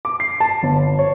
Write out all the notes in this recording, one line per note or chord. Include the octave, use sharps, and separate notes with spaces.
D6
C7
A5
G1
C#5